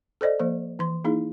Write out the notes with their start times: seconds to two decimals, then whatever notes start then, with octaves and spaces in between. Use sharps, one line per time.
0.21 A4 C5 D5 D#5
0.39 F3 A#3 C5
0.79 E3 C6
1.05 A#3 D#4 E4 G#4